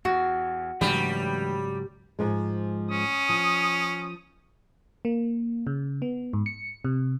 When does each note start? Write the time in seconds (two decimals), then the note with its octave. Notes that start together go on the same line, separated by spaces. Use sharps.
0.05 E2 F#4
0.81 G#2 C#3 E3 F#3 G3 A3 D4
2.19 G#2 F3 G#3
2.91 C#4 D#6
3.29 F3
5.05 A#3
5.67 C#3
6.02 B3
6.33 G#2
6.46 C#7
6.84 C3